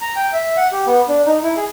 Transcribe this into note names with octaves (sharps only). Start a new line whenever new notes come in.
A#5
G5
E5
F#5
G4
B3
D4
D#4
E4
G#4